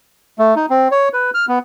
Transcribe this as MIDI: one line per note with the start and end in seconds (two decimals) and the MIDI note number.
0.39 0.55 57
0.56 0.66 63
0.70 0.88 60
0.91 1.09 73
1.13 1.30 71
1.34 1.46 89
1.48 1.59 59